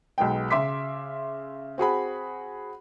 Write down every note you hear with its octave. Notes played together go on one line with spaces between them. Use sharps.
B1 B2 G#3 G5
C#3 E5 C6 D6 B6
C4 F#4 G#4 B5